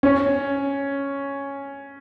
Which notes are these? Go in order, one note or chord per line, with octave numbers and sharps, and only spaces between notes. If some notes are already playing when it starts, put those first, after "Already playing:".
C#4